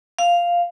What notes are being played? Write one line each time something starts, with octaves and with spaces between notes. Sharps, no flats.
F5